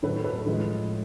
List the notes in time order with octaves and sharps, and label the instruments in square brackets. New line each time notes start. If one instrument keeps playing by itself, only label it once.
[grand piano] A2 F#3 A4 B4
A4 B4
A2 F3 G#3